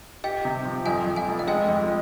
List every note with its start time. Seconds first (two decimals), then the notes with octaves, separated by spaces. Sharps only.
0.24 G4 D#5 G5
0.45 C3
0.65 F3
0.86 F2 F5 G#5
1.07 F2
1.16 F5 G#5
1.28 F1
1.39 F5
1.48 G#3 D#5 G5
1.69 F2